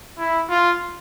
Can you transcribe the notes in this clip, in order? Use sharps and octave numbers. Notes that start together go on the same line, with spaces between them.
E4
F4